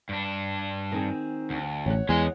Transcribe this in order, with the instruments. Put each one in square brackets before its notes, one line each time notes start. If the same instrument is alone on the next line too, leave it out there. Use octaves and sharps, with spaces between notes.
[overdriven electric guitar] G2 D4
[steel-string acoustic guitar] D#3 C4 G#4
[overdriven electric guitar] D2
[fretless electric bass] A1 [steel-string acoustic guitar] C#5 F#5
[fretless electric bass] E2 [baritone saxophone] G#3 [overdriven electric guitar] C#4 D#5